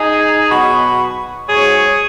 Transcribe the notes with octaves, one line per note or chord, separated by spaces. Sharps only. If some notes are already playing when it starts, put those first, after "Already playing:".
Already playing: D#4 G#4
B2 F#3 F#4 B4
G#2 F#3 G#4 C#5